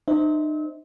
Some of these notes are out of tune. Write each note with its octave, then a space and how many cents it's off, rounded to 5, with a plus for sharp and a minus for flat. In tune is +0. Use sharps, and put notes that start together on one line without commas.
D#4 -40 C5 +0 E5 -40